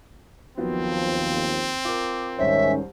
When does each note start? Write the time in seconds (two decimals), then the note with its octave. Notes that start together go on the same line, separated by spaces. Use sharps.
0.57 D#2 F3 F#3 B3 C4 F4
1.85 F4 A#4 D6
2.39 C2 G#2 D#3 C#4 C5 E5